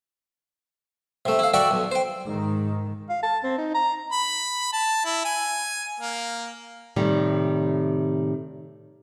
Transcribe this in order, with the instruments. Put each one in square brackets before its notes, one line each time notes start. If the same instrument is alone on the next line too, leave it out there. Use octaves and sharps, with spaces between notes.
[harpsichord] C3 A3
E4 F5
F#4 A4 D5 E5 F#5 G5
B1
C5 G5
[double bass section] G#2 D#3
[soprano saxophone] F5
A5
C4
D#4
A#5
[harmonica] B5
A5
E4
G#5
A#3
[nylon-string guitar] A2 C3 D#3 G3